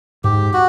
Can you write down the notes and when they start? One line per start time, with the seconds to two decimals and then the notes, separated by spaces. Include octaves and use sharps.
0.24 G#2 G4
0.53 F#4